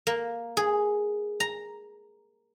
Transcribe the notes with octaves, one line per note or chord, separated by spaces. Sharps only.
A#3
G#4
A#5